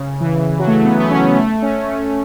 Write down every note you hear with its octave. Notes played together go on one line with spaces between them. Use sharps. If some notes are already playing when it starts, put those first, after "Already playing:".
Already playing: C#3
E3
F#3
A3
F#3
B3
B3
C#4
A3
C#4
A3